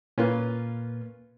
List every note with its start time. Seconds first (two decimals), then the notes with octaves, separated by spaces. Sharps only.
0.18 A#2 A#3 C#4 F4 B4